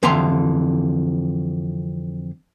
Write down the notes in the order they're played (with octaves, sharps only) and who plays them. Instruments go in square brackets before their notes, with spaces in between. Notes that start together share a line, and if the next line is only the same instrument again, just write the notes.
[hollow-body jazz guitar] F2 D3 E3 E5 A#5 C6